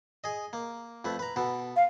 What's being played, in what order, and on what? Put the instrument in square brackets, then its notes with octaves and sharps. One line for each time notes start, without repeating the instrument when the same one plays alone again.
[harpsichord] G#4 D#5
A#3
F2 A3 B4
B4 A#5
B2 B3 A4
[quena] F5